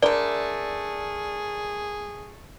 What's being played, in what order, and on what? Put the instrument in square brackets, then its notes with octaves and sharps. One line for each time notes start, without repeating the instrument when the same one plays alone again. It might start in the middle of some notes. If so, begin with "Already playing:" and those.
[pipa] D3 A3 [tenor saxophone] G#4 [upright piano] A#4 [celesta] D5